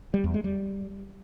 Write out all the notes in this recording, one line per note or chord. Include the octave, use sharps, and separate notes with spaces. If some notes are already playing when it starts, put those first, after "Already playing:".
G3
E2
G#3
G3